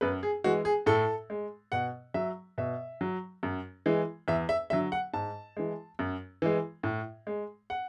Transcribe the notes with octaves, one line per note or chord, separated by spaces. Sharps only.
F#2 B4
G#4
E3 G#3 F#4
G#4
A2 A4
G#3
B2 F#5
F#3 E5
B2 E5
F#3
F#2
E3 G#3
E2 E5
E5
D3 F#3 E5
F#5
G#2 A5
E3 G#3
F#2
E3 G#3
A2
G#3
F#5